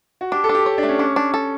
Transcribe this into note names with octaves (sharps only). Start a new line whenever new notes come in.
F#4
D4 G4
A4
D4
G4
C#5
D4
A3
C#4
C#4 D4
D4
A4